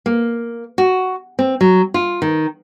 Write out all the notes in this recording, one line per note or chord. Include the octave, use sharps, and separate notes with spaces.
A#3
F#4
C4
F#3
F4
D#3